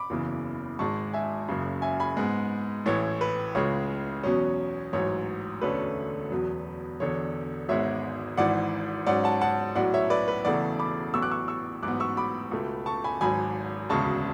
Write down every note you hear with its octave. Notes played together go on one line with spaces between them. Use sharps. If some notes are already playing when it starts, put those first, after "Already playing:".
Already playing: B5 D6
F#1 E2 C#3 E3
G#1 G#2 G#3 A5 C#6
E5 G#5
F#1 F#2 C#3
E5 G#5
G#5 B5
G#2 G#3 B3
A1 A2 E3 C#5
B4
C#2 C#3 G#3 C#5
E2 B2 F#3 C#4
A1 G#2 F#3 C#5
E1 D2 D3 A3 C#4 B4
E1 E2 B2 F#3
E1 E2 D3 C#5
G#1 G#2 G#3 B3 C#5 E5
G#1 G#2 E3 D5 F#5
G#2 F#3 C#4 D5 F#5
F#5 A5
F#5 A5
B1 A2 F#3 D5 F#5
C#5 E5
B4 D5
B4
E1 E2 C#3 E3 A3 D5 F#5
B5 D6
A1 A2 F#3 B3 C#6 E6
D6 F#6
C#6 E6
C#6 E6
A1 G#2 F#3 B3 D6 F#6
C#6 E6
B5 D6
C#2 B2 A3
A5 C#6
G#5 B5
G#1 G#2 F#3 G#5 B5
E1 D2 C#3 G#3 A5 C#6